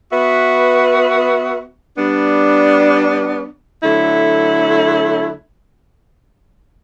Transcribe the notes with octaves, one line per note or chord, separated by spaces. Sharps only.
B3 F#4 B4 E5
G3 B3 D4
D3 F#3 A3 E4